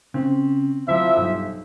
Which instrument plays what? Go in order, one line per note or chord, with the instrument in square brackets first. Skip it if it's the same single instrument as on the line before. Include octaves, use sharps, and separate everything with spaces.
[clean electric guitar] C#3 C#4 [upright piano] C4
[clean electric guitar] D2 F#3 [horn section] F3 E4 E5
[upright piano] B1 [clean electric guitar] G2